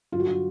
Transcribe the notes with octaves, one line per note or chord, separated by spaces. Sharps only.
G2 D3 F#3 F4
F#4
F4